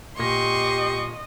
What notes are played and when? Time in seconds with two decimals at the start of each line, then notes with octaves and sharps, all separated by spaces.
0.19 A#2 G4 D#5 C6 C#6 A#6